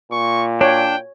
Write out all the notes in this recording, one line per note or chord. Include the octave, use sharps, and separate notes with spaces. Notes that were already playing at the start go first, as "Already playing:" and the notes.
A#2 C#6
D4 C#5 G5